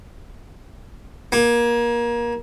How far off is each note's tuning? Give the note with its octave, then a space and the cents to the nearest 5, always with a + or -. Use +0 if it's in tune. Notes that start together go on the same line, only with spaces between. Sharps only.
A#3 +25